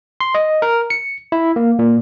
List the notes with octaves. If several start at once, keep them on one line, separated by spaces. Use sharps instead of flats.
C6
D#5
A#4
C#7
E4
A#3
A#2